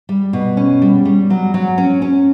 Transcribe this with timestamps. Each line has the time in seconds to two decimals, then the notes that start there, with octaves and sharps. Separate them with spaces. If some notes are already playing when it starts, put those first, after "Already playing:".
0.09 G3
0.33 B2
0.57 C#4
0.82 G3
1.05 G3
1.30 F#3
1.54 F#3
1.78 C#4
2.02 C#4